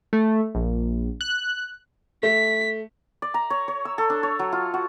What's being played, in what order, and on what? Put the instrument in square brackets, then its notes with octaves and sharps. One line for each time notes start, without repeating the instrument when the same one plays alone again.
[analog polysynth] A3
A#1
F#6
[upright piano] A3 [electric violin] B6
[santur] D5
A#5
C#5
C#5
E6
A4
D4
C#5
F#3
F4
F#4